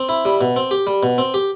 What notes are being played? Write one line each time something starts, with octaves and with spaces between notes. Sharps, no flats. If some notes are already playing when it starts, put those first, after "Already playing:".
Already playing: C4
E4
G3
B2
C4
G4
G3
B2
C4
G4